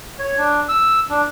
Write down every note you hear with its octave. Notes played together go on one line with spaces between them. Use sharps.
C#5
D4
E6
D4